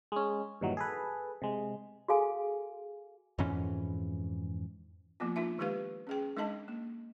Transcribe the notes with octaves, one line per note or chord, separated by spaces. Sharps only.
G#3 C#4
G2 A#2 D#3 E3 F#3
G#4 A4 B4
C3 G#3
F#4 G#4 A4 F5 G5 G#5
F2 G#2 E3 C#4
F3 A#3 B3 F4
D4 D#4 F4 E5
D#3 G#3 D#4 G4 B4 F5
C#4 G#4 G5
G#3 D4 D#4 D#5 A5
A#3